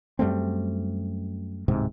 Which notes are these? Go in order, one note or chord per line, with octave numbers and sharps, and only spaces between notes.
F#2 G3 A3 C4
D1 G#2 C3